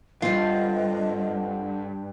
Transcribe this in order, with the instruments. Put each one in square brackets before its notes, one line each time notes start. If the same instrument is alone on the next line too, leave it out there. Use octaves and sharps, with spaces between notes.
[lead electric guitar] E2 G2 [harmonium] D3 [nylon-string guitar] C4 F4 [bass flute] D#5